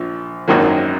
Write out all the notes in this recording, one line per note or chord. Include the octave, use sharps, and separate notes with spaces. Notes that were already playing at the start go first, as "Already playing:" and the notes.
Already playing: A#1 F3
G#1 F#2 D#3 F#3 A#3